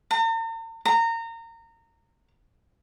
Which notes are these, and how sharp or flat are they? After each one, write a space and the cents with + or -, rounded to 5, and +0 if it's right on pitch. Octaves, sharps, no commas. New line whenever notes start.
A#5 -45
A#5 -25